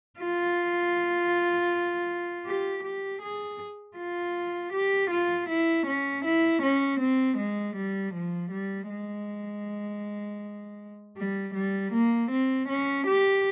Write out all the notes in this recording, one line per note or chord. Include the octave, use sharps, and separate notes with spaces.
F4
G4
G4
G#4
F4
G4
F4
E4
C#4
E4
C#4
C4
G#3
G3
F3
G3
G#3
G3
G3
A#3
C4
C#4
G4